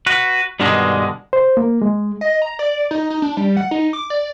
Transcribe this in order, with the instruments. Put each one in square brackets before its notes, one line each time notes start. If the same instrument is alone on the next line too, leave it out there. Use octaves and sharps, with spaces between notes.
[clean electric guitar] F#4 B4
G2 B2 D3 D#3 G#3
[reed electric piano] C5
A#3
G#3
[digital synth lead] D#5
A#5
D5
D#4
D#4
D4
G3
F#5
D#4
D6
D5